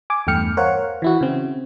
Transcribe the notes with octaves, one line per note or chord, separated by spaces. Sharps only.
G#5 D6
E2 G2 A3 G5 F6 C#7
A#4 C5 C#5 F5 F#5
E3 E4 F#4
C#3 C4